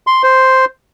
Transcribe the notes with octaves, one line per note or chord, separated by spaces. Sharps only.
C6
C5